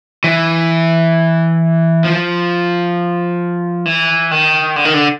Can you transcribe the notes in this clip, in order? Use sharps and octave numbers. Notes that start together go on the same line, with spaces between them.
E3
F3
E3
D#3
D3
D#3
D3